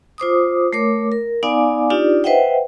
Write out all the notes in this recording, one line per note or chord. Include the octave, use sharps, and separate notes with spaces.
F4 C5 D6 D#6
A3 A#4 C#5 D6
A#4
B3 D#4 D5 F5 G#5 D6
D4 D#4 F4 G4 D5
B4 C5 D#5 E5 F#5 G5